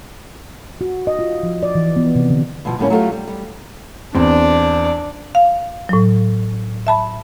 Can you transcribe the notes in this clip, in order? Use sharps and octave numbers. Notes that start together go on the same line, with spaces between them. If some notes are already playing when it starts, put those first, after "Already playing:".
F#4
D#5
F4
F3
D5
E3
B3
C3
D3
G2 B2 E3 F3
A2 D3 G3 A#3 C#4
F#3 A3 C#4 F4 G4
G3
G3
E2 C4 D4 D5
F5
A2 F#3
E5 A5 B5